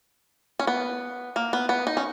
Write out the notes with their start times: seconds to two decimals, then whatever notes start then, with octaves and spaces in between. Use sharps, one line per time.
0.59 C#4
0.67 B3
1.36 A#3
1.53 B3
1.69 B3
1.87 D#4
1.97 C#4